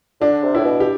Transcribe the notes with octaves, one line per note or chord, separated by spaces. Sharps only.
D3 D4
C3
A2 E4
B2
G4